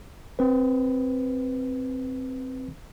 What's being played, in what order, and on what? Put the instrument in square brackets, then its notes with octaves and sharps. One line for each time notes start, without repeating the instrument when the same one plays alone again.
[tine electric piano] C4 B4